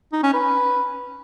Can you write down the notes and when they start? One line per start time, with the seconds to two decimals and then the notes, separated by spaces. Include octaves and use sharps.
0.13 D#4
0.23 C#4
0.33 B4